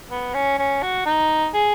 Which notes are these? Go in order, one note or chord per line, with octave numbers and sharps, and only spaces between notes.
B3
C#4
C#4
F#4
D#4
G#4